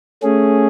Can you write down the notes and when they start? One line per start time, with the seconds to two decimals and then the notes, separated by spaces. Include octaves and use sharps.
0.23 A3 C#4 G#4